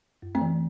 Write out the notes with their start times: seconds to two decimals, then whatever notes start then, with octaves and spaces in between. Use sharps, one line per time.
0.22 F#2
0.35 A3 C4
0.41 E3